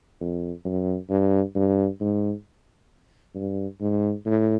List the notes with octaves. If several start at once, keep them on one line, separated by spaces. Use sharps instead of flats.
F2
F#2
G2
G2
G#2
G2
G#2
A2